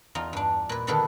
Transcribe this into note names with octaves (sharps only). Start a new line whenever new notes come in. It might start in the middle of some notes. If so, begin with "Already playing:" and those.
E2 D#4 F4
G2 D4
A#2 B4
D3 D#3 B3 G4 A4 B4